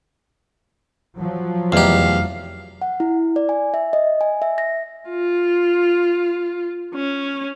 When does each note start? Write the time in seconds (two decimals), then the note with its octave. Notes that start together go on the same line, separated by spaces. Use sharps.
1.17 F3 F#3
1.72 F1 E2 G4 D#5 F5 A#5
2.82 F#5
3.00 E4
3.36 D5
3.49 G#5
3.74 E5
3.93 D#5
4.21 G#5
4.42 E5
4.58 A#6
5.09 F4
6.95 C#4